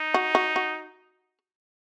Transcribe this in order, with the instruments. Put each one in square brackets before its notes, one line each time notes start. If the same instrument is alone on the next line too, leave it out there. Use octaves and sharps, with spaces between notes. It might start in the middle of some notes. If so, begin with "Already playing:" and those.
Already playing: [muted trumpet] D#4
[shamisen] F#4
F#4
F#4